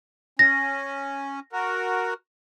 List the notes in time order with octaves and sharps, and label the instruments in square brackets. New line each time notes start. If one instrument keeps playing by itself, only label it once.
[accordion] C#4 [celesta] A#6
[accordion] F#4 A#4